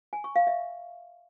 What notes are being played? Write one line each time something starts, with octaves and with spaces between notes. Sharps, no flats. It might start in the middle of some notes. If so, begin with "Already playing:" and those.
G#5
C#6
F5
E5